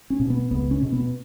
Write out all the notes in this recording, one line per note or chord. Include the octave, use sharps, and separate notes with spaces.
C#4
B2
B3
C#2 B3
C#4
B2
B3